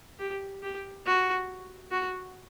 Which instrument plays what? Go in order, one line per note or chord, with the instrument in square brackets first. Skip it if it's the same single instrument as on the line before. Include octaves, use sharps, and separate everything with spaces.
[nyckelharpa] G4
G4
F#4
F#4